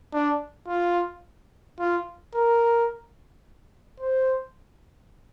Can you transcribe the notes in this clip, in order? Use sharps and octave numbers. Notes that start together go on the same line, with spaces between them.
D4
F4
F4
A#4
C5